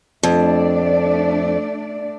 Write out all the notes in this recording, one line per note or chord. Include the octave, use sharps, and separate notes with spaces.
F2 A3 D4 D5